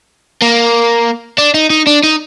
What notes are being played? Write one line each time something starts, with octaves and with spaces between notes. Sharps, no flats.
A#3
D4
D#4
D#4
D4
D#4